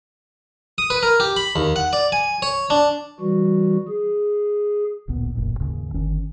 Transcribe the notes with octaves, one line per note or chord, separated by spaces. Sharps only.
D#6
B4
A#4
G4
B5
D#2
F#5
D5
G#5
C#5
D4
E3 G3 F#4
G#4
D1 A1 A#2 B3
E1 A1 F#2 A#2
D#2 G#2 C#3
G1 D#3 C#4